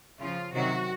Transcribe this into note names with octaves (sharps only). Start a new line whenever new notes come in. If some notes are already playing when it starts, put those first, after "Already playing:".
C#3 F3 F4
C3 D#3 F#3 F#4